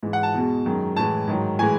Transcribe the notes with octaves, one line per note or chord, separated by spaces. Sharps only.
G#2 E3 G#3
F#5
A5
E2 B2 G#3
F#2 D#3 G#3
A2 E3 G#3 A5
G#2 D#3 F#3
A2 E3 G#3 G#5